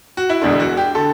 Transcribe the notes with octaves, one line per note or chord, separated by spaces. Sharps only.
F#4
E4
E1 E2 D3 D4
F#4
G4
D3 A4